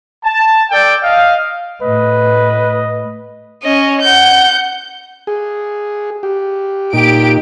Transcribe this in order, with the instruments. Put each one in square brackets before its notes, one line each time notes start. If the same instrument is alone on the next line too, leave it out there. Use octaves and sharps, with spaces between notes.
[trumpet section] A5
A4 D5 G5
D#5 F5
[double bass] A2 [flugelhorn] B4 [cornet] D#5
[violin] C#4 D#5
F#5 G6
[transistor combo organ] G#4
G4
[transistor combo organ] A#2 D#4 [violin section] G4 D7